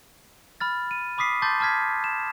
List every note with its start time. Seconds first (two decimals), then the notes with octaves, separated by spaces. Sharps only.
0.60 B5 F6 A6
0.91 D#7
1.18 B5 D6 D#6 B6 C7
1.42 A5 C6 D6 G6 A6
1.60 A5 D6 F6 G#6 B6
2.04 E7